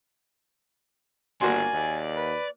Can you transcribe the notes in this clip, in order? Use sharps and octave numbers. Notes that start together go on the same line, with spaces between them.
G1 A#3 F#4 D5 G#5 C6
D#2
B4